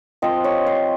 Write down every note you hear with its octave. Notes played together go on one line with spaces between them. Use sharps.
F3 C4 F4 D#5
C#5
C5